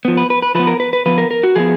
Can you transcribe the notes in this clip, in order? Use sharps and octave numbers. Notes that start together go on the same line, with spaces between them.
F3 B3
B4
B4
B4
F3 B3 B4
A#4
B4
B4
F3 B3 B4
A#4
A#4
F#4
F3 B3 G#4